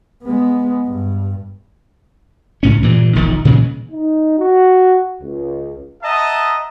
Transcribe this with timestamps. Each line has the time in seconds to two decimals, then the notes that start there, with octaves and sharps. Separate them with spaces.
0.24 G#3 B3
0.86 G2
2.63 C#2 A2 C#4
2.82 G2 A#2 E3
3.15 E1 A#1 A2 D#3
3.45 A#2 C#3 E3 G#3
3.91 D#4
4.38 F#4
5.21 C#2
6.03 D#5 E5 F#5 A5 A#5 D#6